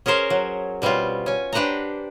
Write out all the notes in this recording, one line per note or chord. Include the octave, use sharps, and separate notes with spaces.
C#4 G#4 A#4 C5 C#5
F#3
B2 G3 C4 C#4 F4
C#4 G#5
D4 G4 B4 C5 F#5 A#5